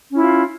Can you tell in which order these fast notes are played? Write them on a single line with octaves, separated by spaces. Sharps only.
C#4 E4 F4